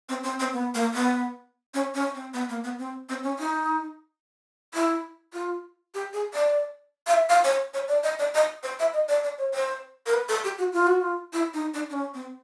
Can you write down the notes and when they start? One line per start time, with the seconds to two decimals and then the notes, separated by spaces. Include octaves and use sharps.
0.09 C4
0.23 C4
0.40 C4
0.53 B3
0.74 A#3
0.94 B3
1.74 C#4
1.94 C#4
2.15 C4
2.34 B3
2.49 A#3
2.64 B3
2.79 C4
3.09 C4
3.23 C#4
3.39 D#4
4.74 E4
5.34 F4
5.94 G4
6.13 G#4
6.34 D5
7.07 F5
7.14 E5
7.29 F5
7.44 C#5
7.74 C#5
7.88 D5
8.04 D#5
8.19 D5
8.34 D#5
8.63 C5
8.79 E5
8.93 D#5
9.08 D5
9.24 D5
9.38 C#5
9.54 C5
10.06 A#4
10.14 B4
10.29 A4
10.44 G4
10.59 F#4
10.73 F4
10.87 F#4
11.01 F4
11.33 E4
11.54 D#4
11.74 D4
11.90 D4
11.93 C#4
12.14 C4